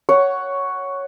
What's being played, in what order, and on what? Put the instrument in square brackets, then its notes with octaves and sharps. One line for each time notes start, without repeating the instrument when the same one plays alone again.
[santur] C#5 F#5